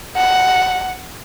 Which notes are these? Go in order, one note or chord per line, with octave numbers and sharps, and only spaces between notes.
F#5